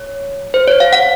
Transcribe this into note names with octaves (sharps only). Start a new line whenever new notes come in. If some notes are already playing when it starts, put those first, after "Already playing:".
Already playing: C#5
C5
C#5
F5
F#5